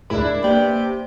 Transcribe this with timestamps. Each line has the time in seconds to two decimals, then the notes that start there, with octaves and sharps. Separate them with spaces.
0.10 D2 A2 G#3 D4 E4 A#4 G#5 B5
0.44 C3 A#3 G4 B4 D5